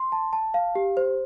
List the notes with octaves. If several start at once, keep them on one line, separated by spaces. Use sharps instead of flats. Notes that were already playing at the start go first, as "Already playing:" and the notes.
Already playing: C6
A5
A5
F5
G4
C5